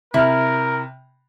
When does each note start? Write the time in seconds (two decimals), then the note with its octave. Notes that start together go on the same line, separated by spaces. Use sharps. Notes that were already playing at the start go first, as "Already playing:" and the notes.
0.14 C3 E4 A#4 F6